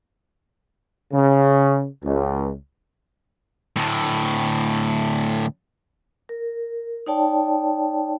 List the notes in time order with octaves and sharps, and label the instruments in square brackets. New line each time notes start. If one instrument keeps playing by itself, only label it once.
[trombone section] C#3
C#2
[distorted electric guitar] D2 A2
[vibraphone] A#4
D#4 C#5 D5 G5 A5